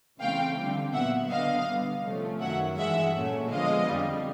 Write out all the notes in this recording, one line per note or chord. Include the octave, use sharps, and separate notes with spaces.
C#3 E3 A3 C4 F5 G5
D3 G3 C4
A#2 F#3 B3 E5 F#5
D3 F#3 B3 D#5 F5
D3 G3 B3
C3 F3 A3 C#4
F#2 D#3 F#3 E5 F#5
G2 E3 G#3 E5 F#5
A#2 F#3 A3 C#4
D3 F3 G#3 B3 D#5 F5
F2 D3 G3